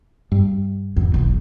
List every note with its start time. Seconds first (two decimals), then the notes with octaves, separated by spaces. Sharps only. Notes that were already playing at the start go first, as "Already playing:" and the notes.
0.32 G2
0.96 E2
1.14 E1 B1